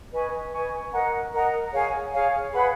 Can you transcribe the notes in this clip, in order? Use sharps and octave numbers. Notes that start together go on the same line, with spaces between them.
B4 D#5 G#5 C#6
B4 D#5 G#5 C#6
A#4 D#5 F#5 A#5
A#4 D#5 F#5 A#5
G#4 C#5 F5 G#5
G#4 C#5 F5 G#5
G#4 B4 F#5 B5